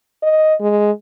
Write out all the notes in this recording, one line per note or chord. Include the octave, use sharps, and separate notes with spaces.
D#5
G#3